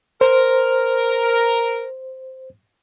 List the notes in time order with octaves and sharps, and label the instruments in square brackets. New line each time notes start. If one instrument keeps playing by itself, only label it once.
[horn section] A#4 [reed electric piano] C5